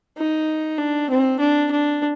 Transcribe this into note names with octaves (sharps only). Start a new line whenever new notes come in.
D#4
D4
C4
D4
D4